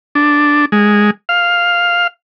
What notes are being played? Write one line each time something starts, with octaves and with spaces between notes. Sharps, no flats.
D4
G#3
F5